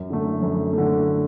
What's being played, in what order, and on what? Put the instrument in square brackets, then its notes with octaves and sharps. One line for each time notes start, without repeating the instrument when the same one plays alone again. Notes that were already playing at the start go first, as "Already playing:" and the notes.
Already playing: [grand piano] F#2
D3 A3
F#2
D3 A3